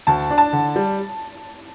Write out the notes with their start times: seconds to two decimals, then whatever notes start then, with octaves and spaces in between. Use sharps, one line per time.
0.07 D2 A5
0.30 D4
0.38 A5
0.53 D3
0.76 G3